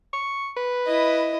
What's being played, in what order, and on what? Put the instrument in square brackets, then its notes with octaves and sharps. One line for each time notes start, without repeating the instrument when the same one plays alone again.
[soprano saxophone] C#6
B4
[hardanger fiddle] E4 D#5